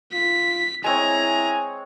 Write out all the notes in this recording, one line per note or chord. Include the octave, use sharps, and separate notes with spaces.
F4 B6
G#3 C4 E4 C#5 G#5 A#5